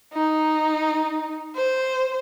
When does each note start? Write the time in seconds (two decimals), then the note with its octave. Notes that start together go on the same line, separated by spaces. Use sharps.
0.13 D#4
1.56 C5